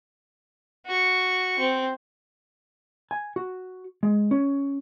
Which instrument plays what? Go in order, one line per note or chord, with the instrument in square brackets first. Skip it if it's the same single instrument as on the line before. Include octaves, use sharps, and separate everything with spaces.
[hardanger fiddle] F#4 C#6
C4
[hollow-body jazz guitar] G#5
F#4
G#3
C#4